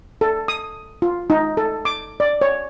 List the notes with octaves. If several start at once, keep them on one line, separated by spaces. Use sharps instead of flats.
A4
D#6
F4
D#4
A4
D6
D5
C#5